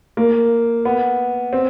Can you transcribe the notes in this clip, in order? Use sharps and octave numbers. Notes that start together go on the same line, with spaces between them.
A#3
B3
C4